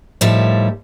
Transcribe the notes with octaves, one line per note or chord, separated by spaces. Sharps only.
A2 D#3 F3 G3 E5